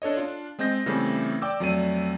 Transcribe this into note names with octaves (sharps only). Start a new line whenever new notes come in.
D4 A4 C#5 D#5
D4 F4
G#3 C4 D#5 G6 A#6
C#3 E3 G3 A3 C4
D5 G5 D6 E6
F2 F#3 A3 D5 D#7